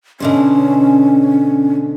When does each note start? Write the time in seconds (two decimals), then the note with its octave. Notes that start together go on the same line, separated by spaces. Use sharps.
0.20 B2 D3 C#4 C5